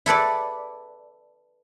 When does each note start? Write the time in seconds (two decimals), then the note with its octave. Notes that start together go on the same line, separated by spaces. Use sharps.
0.06 E4 A4 B4 D5